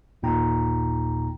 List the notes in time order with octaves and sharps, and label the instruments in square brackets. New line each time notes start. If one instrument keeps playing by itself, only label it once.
[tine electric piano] G1 D#2 A#2 D#4 G5 A#5